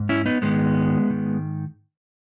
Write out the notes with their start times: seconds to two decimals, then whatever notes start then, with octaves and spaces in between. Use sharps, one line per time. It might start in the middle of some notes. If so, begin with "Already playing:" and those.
Already playing: G#2
0.09 C#4 E4
0.26 B3 D#4
0.42 G#2 D#3 G#3 B3
1.10 G#2 D#3